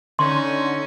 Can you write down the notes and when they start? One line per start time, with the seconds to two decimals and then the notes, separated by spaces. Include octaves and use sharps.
0.19 D3 C#4 D#4 C6